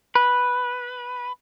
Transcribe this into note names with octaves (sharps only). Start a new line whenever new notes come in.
B4